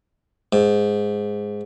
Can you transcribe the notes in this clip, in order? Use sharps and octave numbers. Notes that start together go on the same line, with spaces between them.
G#2